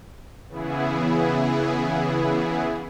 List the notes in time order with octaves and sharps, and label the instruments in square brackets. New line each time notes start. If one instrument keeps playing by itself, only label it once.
[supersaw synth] C#3 E3 B3 E4 G#4